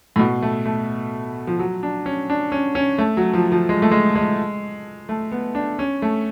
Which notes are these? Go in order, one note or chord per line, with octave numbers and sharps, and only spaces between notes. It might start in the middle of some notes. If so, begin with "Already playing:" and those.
A2
B2
A3
A3
F3
F#3
D4
C#4
D4
C#4
C#4
A3
F#3
F3
F3
G#3
A3
G#3
G#3
A3
B3
D4
C#4
A3